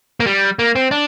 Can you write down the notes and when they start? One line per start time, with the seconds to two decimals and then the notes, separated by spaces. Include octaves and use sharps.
0.20 A#3
0.27 G3
0.59 A#3
0.76 C4
0.91 D4